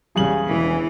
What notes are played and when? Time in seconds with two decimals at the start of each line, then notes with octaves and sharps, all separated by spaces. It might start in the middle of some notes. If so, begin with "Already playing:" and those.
0.16 E2 C#3 G3 G#4 G#5 F#7
0.48 E1 E3